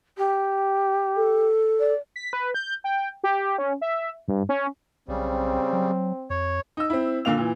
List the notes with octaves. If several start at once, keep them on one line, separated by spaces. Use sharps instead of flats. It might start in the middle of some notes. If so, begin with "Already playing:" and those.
G4
A4
D5
B6
B4
G6
G5
G4
C#4
E5
G2
C#4
B1 C#3 G3 C4
F#3
F2 C#5
D#4 E6
C4 E4
A#2 D3 A#3 F5 F7
A#2 E3